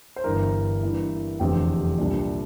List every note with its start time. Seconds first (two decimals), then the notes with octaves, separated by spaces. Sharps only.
0.16 C5
0.24 G1 G2 E3 A#4
0.82 G2 E3 A#3 E4
1.40 F1 E2 D3 F3 C4 G4
1.98 C2 A#2 G3 D4